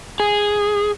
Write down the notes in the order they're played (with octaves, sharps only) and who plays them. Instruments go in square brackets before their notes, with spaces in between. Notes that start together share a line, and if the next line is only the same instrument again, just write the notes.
[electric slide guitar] G#4